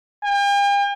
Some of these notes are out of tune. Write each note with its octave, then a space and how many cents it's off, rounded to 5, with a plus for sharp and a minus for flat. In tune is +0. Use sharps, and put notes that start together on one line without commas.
G5 +45